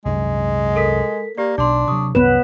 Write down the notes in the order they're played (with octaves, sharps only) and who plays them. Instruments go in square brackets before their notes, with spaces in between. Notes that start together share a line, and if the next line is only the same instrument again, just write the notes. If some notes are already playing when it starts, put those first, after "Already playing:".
[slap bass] C2 F#2 [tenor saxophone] G#3
[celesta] A4 A#4 B6
[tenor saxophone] A#3 [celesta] G4 D5
[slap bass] B1 [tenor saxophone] D4 [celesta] D5 C6
[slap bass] C3 F#3 [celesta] C#6 D#6
[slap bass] C2 F#2 [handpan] B3 B4 [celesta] C#5 E7